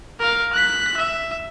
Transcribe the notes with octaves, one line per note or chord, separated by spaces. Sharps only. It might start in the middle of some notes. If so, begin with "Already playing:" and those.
A#4 F5
F#6 B6
E5